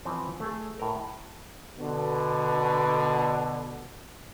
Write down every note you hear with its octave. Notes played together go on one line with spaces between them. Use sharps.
E3 F3 C4
A3 G#4
A2 A#4
B2 D3